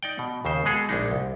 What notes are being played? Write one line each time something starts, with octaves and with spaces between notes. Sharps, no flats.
D#4 D5 G5
B2
D#2 C#3 C5
B2 G#3 G#4 A4
A#1 G#3 D4 D#4
C2